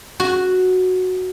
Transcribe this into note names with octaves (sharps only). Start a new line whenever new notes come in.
F#4